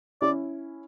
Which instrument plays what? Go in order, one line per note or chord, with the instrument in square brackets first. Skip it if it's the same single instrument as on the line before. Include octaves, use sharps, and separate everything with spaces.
[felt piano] C#4 E4 [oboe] D5